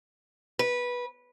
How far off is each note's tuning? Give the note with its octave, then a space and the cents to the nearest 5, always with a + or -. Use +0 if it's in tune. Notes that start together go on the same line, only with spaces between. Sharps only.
B4 -15